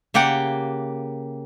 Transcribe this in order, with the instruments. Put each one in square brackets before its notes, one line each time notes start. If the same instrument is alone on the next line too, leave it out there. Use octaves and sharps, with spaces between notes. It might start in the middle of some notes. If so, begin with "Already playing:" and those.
[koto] C#3 A#3 G4 F#5 G5